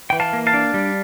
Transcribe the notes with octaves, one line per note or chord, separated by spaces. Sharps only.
E3 G5
F5 A5
A#3
F5 A5
D4
G3